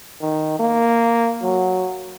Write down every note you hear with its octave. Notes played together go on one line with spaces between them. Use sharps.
D#3
A#3
F#3